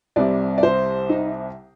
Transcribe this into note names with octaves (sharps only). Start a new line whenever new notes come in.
C2 C3 G3 D5
D5
C5
D#4